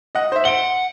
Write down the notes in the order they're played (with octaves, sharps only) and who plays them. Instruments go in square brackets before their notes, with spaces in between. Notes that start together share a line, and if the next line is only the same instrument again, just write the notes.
[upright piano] D#5 F#5
C5 E5
[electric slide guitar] F#5 [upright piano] D7 G7